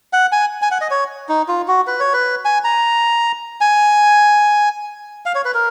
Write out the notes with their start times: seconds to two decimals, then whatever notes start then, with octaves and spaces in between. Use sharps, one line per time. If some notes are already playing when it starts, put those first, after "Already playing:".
0.13 F#5
0.32 G#5
0.62 G#5
0.71 F#5
0.81 D#5
0.91 C#5
1.29 D#4
1.48 F4
1.68 F#4
1.87 B4
2.00 C#5
2.13 B4
2.45 G#5
2.64 A#5
3.61 G#5
5.26 F5
5.35 C#5
5.45 B4
5.54 A#4